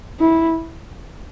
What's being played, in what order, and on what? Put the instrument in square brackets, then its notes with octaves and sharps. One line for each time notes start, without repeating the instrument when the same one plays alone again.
[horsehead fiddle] E4